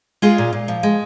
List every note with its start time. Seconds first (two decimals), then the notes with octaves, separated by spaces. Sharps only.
0.22 G#3 F4 G#4
0.38 A#2
0.53 A#2
0.68 F3
0.83 G#3